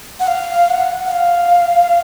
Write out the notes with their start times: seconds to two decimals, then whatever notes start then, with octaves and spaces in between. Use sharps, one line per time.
0.20 F#5
0.27 F5
0.70 F#5
1.06 F#5
1.11 F5